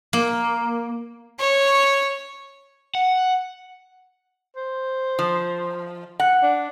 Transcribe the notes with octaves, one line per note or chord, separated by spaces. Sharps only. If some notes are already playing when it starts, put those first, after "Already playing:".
A#3
C#5
F#5
C5
F3
F#5
D4